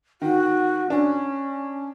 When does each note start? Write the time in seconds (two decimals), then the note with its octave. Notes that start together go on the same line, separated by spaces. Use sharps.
0.22 D#3 F#4
0.90 C#4 D4